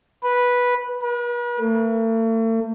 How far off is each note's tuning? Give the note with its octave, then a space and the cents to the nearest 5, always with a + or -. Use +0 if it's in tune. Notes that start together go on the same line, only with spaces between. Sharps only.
B4 -10
B4 -45
A3 +40